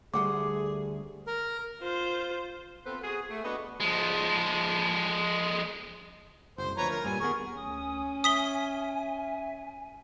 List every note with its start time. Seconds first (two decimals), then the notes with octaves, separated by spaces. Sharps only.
0.14 D2 G3 A3 G#4 F#5 C6 D6
1.27 A#4
1.82 F4 C5
2.85 B3 C4 F4 A4 B4 C5
3.02 F#4 G#4
3.31 A3
3.44 B3 D4 F#4 D#5
3.80 F3 G#3
6.58 F#1 C2 C5
6.77 D2 F3 B4 C#5 A#5
6.89 A#4
7.04 G2 A#2 G3 G#5
7.20 D#2 B3 G#4 A#4 C#6
7.57 D2 C#4 G#5 D#6
8.24 E5 D#6 B6 G7